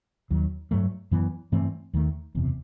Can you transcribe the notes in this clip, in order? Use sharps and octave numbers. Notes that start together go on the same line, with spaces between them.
D#2 D#3 F#3
G2 F#3 A3
F#2 E3 B3
G2 E3 A3 C4
D#2 D#3 A3
F#1 E2 C3